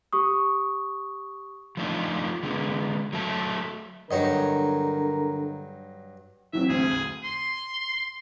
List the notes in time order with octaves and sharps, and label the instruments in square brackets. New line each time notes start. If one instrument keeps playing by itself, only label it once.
[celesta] G4 C#6 D#6
[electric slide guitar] F3 A3 D4 D#4 F4
D3 G#3 B3
F#3 A3 A5
[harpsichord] G2 F#3 D#4 [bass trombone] D3 [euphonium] A#4 [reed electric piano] C#5 D#5
[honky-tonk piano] E3 F#3 C4 [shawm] E5
[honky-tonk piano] D2 C4 [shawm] G#4
[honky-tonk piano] D#7 F#7
[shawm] C6